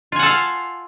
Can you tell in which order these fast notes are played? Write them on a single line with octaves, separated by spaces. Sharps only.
F4 G#5 F#5 A4 F5